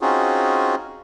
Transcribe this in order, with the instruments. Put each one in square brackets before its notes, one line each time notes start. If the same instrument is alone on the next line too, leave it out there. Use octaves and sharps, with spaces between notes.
[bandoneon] C4 C#4 D#4 F4 F#4 G#4